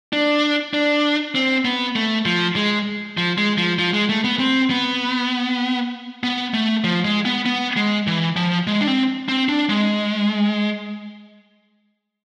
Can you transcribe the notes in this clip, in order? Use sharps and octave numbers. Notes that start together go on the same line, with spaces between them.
D4
D4
C4
B3
A3
F3
G#3
F3
G#3
F3
F3
G#3
A3
B3
C4
B3
B3
A3
F3
G#3
B3
B3
G#3
E3
F3
G#3
D4
C4
C4
D4
G#3